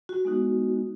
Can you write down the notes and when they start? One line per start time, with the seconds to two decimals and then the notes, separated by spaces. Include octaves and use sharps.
0.09 F#4
0.25 G#3 B3 D#4 F#4